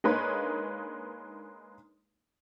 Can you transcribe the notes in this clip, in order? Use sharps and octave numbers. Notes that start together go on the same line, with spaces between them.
G#3 A#3 D4 D#4 B4 C#5